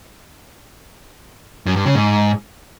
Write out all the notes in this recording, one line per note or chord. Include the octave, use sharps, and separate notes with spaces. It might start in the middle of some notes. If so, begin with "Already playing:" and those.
F#2
G2
C#3
G#2